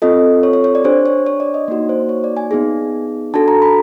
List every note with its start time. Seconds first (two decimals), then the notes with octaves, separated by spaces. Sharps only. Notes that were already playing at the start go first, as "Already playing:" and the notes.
0.02 C4 F4 A4 D#5
0.43 C#5
0.53 C#5
0.64 C#5
0.75 D5
0.84 D4 G4 C5
1.06 C#5
1.26 C#5
1.40 D5
1.54 D#5
1.68 A#3 D#4 F#4
1.89 C5
2.09 C#5
2.24 D5
2.37 G#5
2.51 B3 D#4 G#4
3.34 D4 F#4 A4 A5
3.48 A#5
3.62 B5